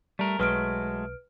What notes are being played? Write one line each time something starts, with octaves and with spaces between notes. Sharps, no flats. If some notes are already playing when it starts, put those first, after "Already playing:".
G3 A3 A#4
B1 F#3 G#3 A3 B4 F6 D7